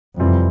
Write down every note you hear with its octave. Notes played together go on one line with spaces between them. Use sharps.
F2 C3 E3 G3 C4 F4